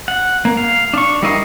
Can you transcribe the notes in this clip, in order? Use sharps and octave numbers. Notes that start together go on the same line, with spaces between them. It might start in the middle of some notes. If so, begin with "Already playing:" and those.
F#5
A#3
F5
D4 C#6
G3 E4 A#4 D#5 F5